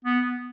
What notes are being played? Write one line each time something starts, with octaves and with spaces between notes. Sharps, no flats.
B3